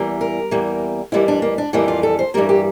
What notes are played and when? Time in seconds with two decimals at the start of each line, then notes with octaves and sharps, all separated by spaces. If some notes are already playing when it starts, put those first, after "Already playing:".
Already playing: E2 E3 G3 A#3
0.21 A#4
0.51 E2 E3 G3 A#3
1.12 F2 E3 G3 A#3 E4
1.28 D4
1.42 A#3
1.58 D4
1.73 F2 E3 G3 A#3 E4
1.88 F4
2.03 A4
2.19 C5
2.34 G2 E3 G3 A#3 A#4
2.49 G4